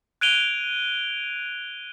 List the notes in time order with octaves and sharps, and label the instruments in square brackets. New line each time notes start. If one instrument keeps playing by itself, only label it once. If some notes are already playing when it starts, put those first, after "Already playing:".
[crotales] F#6 G#6 D7 D#7 F7 G7